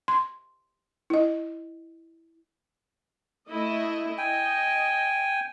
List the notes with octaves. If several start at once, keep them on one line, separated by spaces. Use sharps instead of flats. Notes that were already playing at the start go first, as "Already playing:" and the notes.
C6
E4 D#5
A3 E4 D#5
D#5 G5 G#5